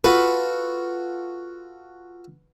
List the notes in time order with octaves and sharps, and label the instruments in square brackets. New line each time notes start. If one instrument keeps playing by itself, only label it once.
[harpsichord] F4 F#4 A4 [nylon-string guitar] B4